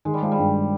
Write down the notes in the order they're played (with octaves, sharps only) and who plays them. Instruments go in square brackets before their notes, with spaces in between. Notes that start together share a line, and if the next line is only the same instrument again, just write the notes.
[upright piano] D#3 [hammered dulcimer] G#3
[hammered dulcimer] G3
[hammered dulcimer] F3 [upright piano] G#3
[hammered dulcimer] G3
[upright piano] G2